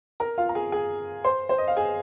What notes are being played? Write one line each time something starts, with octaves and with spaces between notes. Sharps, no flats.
A#4 A#5
F4 F5
A#5
G#4 G#5
G#4 G#5
C5 C6
C5
D#5
F5
G#4 G#5